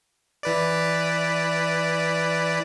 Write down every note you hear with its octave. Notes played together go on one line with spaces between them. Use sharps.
E3 B4 D5